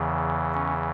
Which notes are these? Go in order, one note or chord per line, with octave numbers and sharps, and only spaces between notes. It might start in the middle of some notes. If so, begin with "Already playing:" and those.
Already playing: E2 C#3 E3
C#4